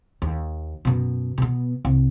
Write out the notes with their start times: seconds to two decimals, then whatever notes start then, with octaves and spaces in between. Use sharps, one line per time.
0.22 D#2
0.85 F#2 B2
1.38 B2 B3
1.85 C2